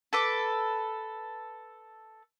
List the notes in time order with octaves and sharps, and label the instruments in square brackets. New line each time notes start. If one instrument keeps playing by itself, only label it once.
[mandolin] A4 B4 D6